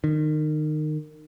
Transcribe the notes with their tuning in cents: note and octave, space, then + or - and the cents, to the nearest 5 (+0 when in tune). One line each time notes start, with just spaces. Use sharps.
D#3 -25